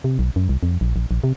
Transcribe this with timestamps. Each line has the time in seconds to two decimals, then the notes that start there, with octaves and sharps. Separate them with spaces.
0.04 C3
0.19 B1
0.36 F#2
0.49 C2
0.63 F2
0.81 A#1
0.96 A#1
1.11 A#1
1.24 C3